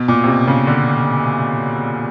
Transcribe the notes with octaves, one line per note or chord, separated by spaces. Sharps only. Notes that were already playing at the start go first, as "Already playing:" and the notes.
Already playing: B2
A#2
C3
B2
C#3
D3